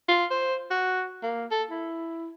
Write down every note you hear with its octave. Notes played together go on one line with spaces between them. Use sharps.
F4
C5
F#4
A#3
A4
E4